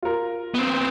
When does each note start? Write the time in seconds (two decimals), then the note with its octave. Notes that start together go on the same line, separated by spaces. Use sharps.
0.03 F4 A#4
0.54 B3 C4